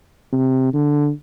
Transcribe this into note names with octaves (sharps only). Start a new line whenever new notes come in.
C3
D3